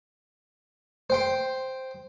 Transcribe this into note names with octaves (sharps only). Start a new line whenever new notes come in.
C5 G5 C6